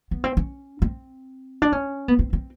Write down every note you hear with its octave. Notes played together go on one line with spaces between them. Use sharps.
B3
C4
C#4
C4
D4
C#4
B3
C4
C4